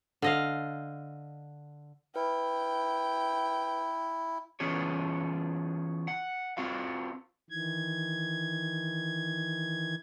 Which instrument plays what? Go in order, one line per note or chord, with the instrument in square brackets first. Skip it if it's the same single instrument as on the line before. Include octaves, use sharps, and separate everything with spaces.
[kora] D3 D#5 F5
[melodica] E4 [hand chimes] B4 [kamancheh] G5
[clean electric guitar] E3 B3 C#4 F4 G#4 C#5
F#5
C4 F4 F#4 F5
[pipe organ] D#3 E3 G#6